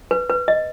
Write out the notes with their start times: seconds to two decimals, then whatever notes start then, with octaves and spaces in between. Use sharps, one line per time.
0.11 B4
0.30 B4
0.48 D#5